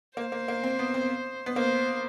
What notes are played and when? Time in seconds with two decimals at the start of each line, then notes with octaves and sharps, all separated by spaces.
0.17 A#3 C5
0.32 A#3
0.48 A#3
0.63 C4
0.79 B3
0.94 C4
1.46 B3
1.56 A#3 C5